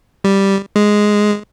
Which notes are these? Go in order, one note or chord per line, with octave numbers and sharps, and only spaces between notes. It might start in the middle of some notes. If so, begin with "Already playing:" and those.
G3
G#3